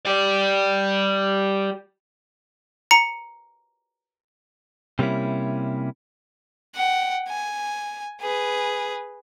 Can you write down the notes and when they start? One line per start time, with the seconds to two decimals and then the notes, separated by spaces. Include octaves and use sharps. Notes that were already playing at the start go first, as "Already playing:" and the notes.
0.05 G4 D5
2.91 A#5 C#7
4.99 C3 G3 A#3 C#4 E4
6.76 F#5 G5
7.29 G#5
8.22 G#4 B4